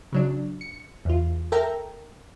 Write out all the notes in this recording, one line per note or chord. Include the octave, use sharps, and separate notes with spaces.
C#3 F#3 D4
C#7
E2 F4
A4 A#4 E5 G5 A#5